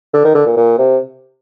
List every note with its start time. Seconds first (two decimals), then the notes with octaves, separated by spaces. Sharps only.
0.13 D3
0.24 D#3
0.34 D3
0.46 A#2
0.56 A#2
0.78 C3